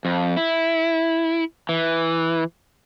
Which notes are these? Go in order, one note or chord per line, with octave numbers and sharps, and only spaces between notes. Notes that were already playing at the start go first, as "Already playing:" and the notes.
F2
E4
E3